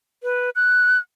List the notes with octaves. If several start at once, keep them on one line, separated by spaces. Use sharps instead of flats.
B4
F#6